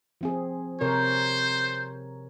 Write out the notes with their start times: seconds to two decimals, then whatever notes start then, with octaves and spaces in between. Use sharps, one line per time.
0.21 F3 C4 G#4
0.81 C3 A#4 C5 C#5